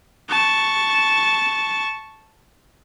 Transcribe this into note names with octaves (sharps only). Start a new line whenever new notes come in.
A5 C#6